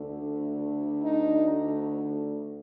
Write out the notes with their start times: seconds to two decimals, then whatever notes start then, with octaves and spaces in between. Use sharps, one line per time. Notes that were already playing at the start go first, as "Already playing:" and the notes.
Already playing: D2 D3 A3
1.03 D#4